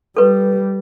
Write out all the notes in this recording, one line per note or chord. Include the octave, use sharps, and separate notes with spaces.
G3 A4 B4